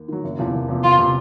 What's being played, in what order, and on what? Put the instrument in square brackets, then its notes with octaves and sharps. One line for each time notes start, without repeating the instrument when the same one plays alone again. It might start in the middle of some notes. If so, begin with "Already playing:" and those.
Already playing: [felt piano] D#2
D#3 F#3
F#1
E2 C3 F3
F#1
E2 C3 F3
[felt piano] F#1 [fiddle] F4
[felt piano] C3 F3